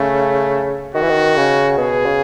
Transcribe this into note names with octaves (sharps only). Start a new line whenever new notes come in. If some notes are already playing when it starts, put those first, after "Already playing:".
Already playing: C#3 A3
D#3 F#4
E3
D#3
C#3
B2 G#4
C#3